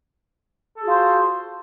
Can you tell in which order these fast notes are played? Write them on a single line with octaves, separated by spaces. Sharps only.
A4 G#4 F#4 F4 C5